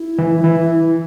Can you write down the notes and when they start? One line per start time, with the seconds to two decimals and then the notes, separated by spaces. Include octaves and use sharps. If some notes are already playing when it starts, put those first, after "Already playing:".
Already playing: E4
0.18 E3
0.44 E3